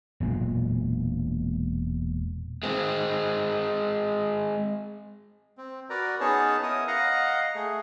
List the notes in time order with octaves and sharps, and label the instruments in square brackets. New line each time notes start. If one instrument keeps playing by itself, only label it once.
[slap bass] E1 A#2 F#3 G#3
[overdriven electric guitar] G#3 C4
[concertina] C4
F#4 A#4 B4 D5 A#5
B3 C#4 D#4 G#4 C#5 A5
B3 E4 A#4 C#5 D#6
D#5 F5 F#5 A#5
A3 G#4